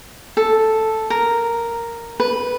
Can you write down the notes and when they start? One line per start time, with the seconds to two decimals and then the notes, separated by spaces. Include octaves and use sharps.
0.37 A4
1.10 A#4
2.20 B4